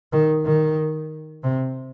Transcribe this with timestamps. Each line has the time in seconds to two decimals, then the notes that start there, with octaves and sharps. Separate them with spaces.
0.13 D#3
0.45 D#3
1.43 C3